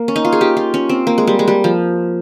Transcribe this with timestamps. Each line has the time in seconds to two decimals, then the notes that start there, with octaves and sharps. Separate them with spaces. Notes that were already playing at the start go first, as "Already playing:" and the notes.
Already playing: A#3
0.08 C#4
0.16 D#4
0.25 F4
0.33 G#4
0.41 G4
0.57 F4
0.74 C#4
0.89 C4
1.07 A#3
1.18 G#3
1.28 G3
1.39 G#3
1.48 G3
1.64 F3